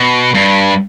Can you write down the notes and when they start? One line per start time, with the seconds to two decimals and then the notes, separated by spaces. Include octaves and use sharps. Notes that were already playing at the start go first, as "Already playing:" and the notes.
Already playing: B2
0.34 G2